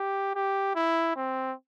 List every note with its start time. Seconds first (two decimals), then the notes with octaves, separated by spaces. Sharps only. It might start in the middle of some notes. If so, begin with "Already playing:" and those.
Already playing: G4
0.35 G4
0.75 E4
1.16 C4